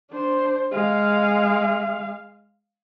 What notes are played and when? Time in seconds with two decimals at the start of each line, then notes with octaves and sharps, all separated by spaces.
0.12 D4 C5
0.72 G#3 F5